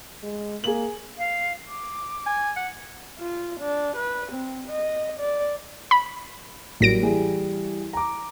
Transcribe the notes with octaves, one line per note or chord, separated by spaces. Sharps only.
G#3
A#3 G#4 F#7
F5
D6
G#5
F#5
F4
D4
B4
C4
D#5
D5
B5
A1 F#3 G3 A#3 A#6 D7
E3 G3 G#4
A#5 D6